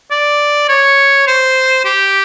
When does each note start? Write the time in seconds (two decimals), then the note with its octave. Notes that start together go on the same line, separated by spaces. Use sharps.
0.11 D5
0.69 C#5
1.28 C5
1.85 G4